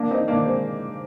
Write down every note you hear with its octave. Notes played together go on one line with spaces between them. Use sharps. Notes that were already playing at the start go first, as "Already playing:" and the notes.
Already playing: A#3 D4
C4 D#4
A#3 D4
G#3 C4